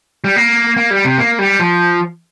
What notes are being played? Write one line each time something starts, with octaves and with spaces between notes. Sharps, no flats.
G3
A#3
A#3
G3
C3
A#3
G3
F3